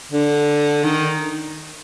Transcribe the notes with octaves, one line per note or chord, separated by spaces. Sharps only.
D3
D#3